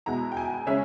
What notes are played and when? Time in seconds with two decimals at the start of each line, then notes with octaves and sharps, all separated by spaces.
0.06 B2 G#3 B3 E4 A#5
0.32 G5
0.37 G#5
0.66 C#3 G#3 C#4 E5